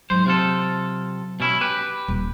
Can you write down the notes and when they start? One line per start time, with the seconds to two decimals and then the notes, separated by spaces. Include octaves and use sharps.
0.10 G#2 F#3 C5
0.26 C3 F4 A4
1.40 B2 C#4 E4
1.61 G4 B4
2.08 D#1